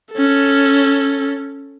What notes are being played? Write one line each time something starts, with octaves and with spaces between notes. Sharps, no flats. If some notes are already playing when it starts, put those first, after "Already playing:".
C#4 A4